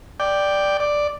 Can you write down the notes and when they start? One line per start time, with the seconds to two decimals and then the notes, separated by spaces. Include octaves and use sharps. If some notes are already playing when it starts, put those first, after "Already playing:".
0.20 D5 G5
0.80 D5